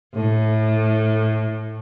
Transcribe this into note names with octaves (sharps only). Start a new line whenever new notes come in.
A2